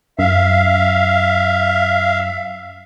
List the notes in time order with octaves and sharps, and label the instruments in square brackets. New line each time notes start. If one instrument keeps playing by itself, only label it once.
[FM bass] F#2 [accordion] E5 F5